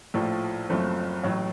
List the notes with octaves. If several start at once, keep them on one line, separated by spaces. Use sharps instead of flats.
A#1 A2 F3 A3
F#1 F#2 F3 A3 C4
A1 A2 F#3